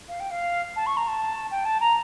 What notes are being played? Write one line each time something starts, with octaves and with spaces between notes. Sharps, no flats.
F5
G5
F5
A5
C#6
A#5
A5
G5
A5
A#5